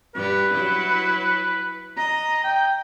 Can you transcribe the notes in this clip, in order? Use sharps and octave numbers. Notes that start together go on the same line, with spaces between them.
G2 G4 B4
F#3 E4
D#5 A#5
G5